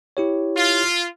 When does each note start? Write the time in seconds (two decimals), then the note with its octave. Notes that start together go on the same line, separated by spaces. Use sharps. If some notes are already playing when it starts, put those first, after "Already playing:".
0.17 E4 G4 C#5
0.57 F4